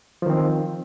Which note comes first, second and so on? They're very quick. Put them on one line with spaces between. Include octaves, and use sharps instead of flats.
F3 D#3 C4